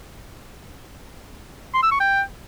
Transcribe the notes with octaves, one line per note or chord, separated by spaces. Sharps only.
C6
E6
C#6
G5